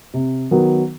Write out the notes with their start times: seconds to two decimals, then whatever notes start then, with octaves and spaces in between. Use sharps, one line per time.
0.14 C3
0.51 D#3 F#3 B3